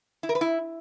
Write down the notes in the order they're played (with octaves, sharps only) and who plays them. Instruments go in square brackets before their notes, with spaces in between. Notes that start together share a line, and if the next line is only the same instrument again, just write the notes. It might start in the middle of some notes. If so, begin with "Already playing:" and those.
[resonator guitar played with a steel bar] E4
A#4
B4
E4